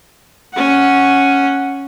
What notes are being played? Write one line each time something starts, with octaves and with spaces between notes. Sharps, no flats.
C#4 F#5